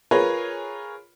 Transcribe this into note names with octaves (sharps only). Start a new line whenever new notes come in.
F4 G#4 A#4 B4 C#5